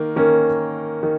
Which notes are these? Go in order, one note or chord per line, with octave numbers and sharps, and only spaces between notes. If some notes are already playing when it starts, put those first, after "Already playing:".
Already playing: D#3 A#3
D#3 A#3 C#4
D#3